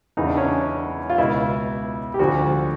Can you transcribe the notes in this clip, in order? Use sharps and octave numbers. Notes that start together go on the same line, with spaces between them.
E2 C#3 E3 D#4
D4
C#4
D4
F4
C#2 B2 E4
G4
D2 D3 F3 F#4